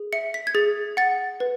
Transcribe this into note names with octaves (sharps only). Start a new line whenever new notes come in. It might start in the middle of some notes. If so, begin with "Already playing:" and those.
Already playing: G#4
E5 C#7
B6
G#6
G#4 A6
F#5 A6
B4